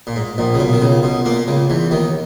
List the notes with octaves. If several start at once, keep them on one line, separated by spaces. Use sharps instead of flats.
A#2
G#2
A#1 A#2
C#3
B1 B2
D#3
C#2 C#3
B1 B2
A#2 A#3
C#2 C#3
E2 E3
D#2 D#3